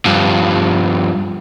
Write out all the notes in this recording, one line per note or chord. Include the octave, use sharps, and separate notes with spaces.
G2 F3